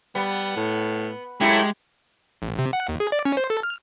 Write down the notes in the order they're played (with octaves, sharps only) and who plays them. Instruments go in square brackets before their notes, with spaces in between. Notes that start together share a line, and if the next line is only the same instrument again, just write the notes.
[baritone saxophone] G3 [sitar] B3
[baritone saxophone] A2
[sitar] F#2 A3 E4 [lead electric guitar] G#3 [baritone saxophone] G4
[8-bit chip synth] A1
C3
F#5
D#2
G#4
D5
C#4
C5
A4
F6